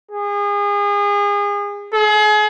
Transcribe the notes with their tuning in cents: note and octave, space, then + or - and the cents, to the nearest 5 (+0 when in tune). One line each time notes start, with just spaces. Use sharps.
G#4 -30
G#4 +35